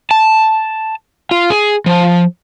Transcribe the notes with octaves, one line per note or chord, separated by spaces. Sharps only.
A5
F4
G#4
F3